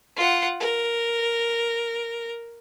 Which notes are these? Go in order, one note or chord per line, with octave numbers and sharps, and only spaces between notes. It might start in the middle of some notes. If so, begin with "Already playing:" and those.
F4 F#5
A#4